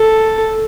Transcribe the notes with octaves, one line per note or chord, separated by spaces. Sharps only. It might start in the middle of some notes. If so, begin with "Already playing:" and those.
Already playing: A4